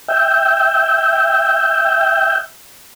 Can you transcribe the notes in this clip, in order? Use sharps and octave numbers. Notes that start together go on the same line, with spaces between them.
E5 G5